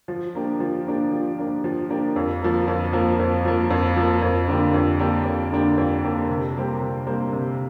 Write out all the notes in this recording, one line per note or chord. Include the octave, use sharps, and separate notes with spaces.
F3
A#3 D4 G4
F3
A#3 D4 G4
F3
A#3 D4 G4
F3
A#3 D4 G4
F2
F3 A#3
F2
F3 A#3
F2
F3 A#3
F2
F3 A#3
F2
D3 A#3 D4 G4
F2
D3 A#3 D4 G4
F2
D3 A#3 D4 G4
F2
D3 A#3 D4 G4
C3
G3 A#3 G4 C5
C3
G3 A#3 G4 C5
C3